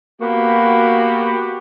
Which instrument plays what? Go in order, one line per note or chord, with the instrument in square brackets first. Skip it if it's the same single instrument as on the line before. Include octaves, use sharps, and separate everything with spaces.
[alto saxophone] A#3 [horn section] B3 F#4 G4